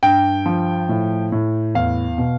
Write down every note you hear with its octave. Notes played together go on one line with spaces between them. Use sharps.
G2 G5
F3
A2
A2
E2 F5
B2